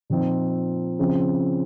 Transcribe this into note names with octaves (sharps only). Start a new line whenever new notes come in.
A#2 F3 C4 D#4
C#3 F3 C4